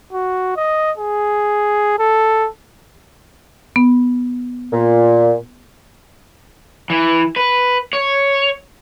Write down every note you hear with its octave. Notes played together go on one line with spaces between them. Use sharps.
F#4
D#5
G#4
A4
B3
A#2
E3
B4
C#5